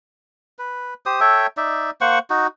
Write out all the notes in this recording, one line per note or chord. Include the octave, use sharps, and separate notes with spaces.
B4
G4 C5 D#6
A4 C#5 E5 G5
D#4 D5 E5
A#3 C5 F#5 C#6
D#4 F#4